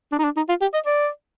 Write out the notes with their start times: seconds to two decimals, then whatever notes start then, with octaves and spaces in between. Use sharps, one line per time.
0.12 D4
0.18 D#4
0.24 D4
0.36 D#4
0.49 F4
0.61 G4
0.74 D#5
0.86 D5